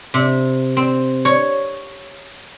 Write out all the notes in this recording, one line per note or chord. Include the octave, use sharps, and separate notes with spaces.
C3
C4
C#5